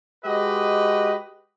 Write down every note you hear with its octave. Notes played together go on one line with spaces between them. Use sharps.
G#3 F#4 G4 B4 D#5